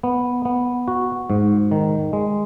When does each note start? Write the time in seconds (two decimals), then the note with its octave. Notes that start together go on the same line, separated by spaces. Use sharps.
0.03 B3
0.45 B3
0.88 F#4
1.30 G#2
1.71 D#3
2.13 G#3